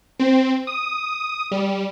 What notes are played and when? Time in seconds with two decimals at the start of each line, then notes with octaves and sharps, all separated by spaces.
0.19 C4
0.67 D#6
1.51 G3